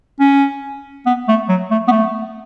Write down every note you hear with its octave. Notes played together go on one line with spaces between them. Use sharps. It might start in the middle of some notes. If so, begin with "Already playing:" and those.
C#4
B3
A3
F#3
A3
B3
A3